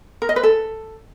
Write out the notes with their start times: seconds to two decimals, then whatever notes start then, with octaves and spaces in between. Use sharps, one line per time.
0.22 A#4
0.29 D#5
0.36 B4
0.43 A4